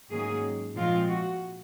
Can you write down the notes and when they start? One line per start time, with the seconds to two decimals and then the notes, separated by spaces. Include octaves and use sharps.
0.11 G#2 D#3 F#3 A#3 C#4 G#4
0.75 A#2 F3 G#3 C4 F4
1.08 F#4